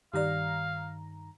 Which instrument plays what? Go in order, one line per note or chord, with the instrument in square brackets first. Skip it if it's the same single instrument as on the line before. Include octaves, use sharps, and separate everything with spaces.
[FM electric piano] G2 D#3 A#5 [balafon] G4 D5 [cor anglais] F5